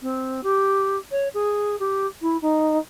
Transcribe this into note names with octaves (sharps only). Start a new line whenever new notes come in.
C4
G4
C#5
G#4
G4
E4
D#4